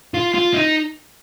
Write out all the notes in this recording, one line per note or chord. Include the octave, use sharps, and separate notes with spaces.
F4
F4
D#4